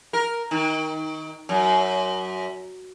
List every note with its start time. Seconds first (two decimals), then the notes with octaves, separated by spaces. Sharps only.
0.13 A#4
0.51 D#3
1.49 F#2